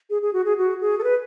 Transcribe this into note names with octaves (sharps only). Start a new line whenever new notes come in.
G#4
G#4
F#4
G#4
F#4
G#4
A4
B4